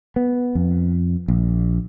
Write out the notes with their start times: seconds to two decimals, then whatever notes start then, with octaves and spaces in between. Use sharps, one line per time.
0.16 B3
0.55 F2
1.28 A#1